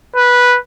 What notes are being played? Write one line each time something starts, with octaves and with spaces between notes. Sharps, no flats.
B4